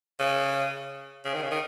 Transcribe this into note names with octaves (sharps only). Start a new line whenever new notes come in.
C#3
C#3
D#3
C#3
D#3